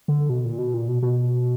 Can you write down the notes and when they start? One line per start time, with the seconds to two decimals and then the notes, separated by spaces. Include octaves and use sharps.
0.08 D3
0.29 B2
0.45 A#2
0.58 B2
0.74 A#2
0.88 B2
1.02 B2